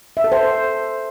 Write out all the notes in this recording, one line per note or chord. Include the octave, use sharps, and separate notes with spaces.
E5
A4
C5